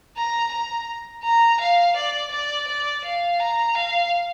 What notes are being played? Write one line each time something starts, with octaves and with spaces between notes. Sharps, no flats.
A#5
A#5
A#5
F5
D5
D5
D5
F5
A#5
F5